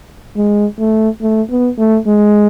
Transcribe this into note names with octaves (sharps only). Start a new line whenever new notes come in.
G#3
A3
A3
B3
A3
G#3